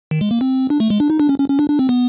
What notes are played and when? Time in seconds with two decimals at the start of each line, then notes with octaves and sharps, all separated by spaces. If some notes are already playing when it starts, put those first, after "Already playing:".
0.11 D#3
0.21 G#3
0.31 A#3
0.41 C4
0.70 D4
0.80 A3
0.90 G#3
1.00 D4
1.10 D#4
1.20 D4
1.29 C#4
1.40 C#4
1.50 C#4
1.59 D4
1.70 D4
1.79 C4
1.89 B3